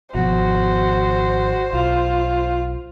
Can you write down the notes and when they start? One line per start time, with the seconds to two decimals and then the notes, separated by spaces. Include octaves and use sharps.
0.15 G#1 B2 F3 F#4 C5
1.73 B1 F4